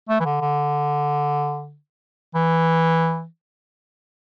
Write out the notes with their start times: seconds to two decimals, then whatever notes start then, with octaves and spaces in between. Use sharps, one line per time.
0.09 A3
0.20 E3
0.25 D3
0.41 D3
2.35 E3